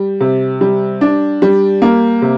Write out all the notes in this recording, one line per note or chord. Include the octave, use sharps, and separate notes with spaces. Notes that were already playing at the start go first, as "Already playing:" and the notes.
Already playing: G3
C3
G3
D4
G3
A#3
C3